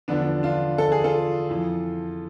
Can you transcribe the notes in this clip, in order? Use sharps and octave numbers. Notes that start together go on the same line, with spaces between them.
E2 D3 F3 B3 D4
D4 F4
A4
G#4
F4 A4
F2 E3